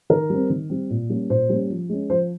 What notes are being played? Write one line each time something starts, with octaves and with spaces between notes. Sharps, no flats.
D#3 A#4
G3 C4
D#3
G3 C4
A#2
G3 A#3 C#4
A#2 C5
G3 A#3 C#4
F3
G#3 C#4
F3 C5